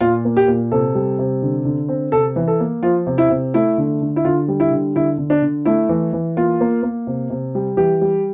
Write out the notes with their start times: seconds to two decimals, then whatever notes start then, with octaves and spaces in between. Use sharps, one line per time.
0.01 A#2 F4
0.25 A#3
0.37 G4
0.48 A#2
0.72 C3 A4
0.95 G3
1.19 C3
1.42 D3
1.65 D3
1.88 C4
2.12 C3 A4
2.36 E3
2.48 A4
2.60 A#3
2.83 F3 F4
3.07 C3
3.18 E4
3.30 C3
3.54 A3 E4
3.78 D3
4.02 D3
4.16 E4
4.25 D3 F4
4.48 G3
4.60 E4
4.71 D3
4.95 D3 E4
5.18 D3
5.30 D4
5.42 D3
5.65 A3 E4
5.89 E3
6.13 E3
6.37 A#3 F4
6.61 A#3
6.83 A#3
7.07 C3
7.30 C3
7.55 G3
7.77 E3 G4
8.01 G3